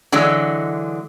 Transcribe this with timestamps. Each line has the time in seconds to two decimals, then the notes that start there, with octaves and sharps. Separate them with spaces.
0.12 D3 E3 F#3 G#3